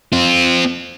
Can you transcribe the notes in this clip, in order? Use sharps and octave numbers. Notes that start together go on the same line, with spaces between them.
C4 F4